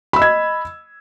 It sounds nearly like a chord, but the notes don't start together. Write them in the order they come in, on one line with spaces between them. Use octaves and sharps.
B5 E6 D#5 G#6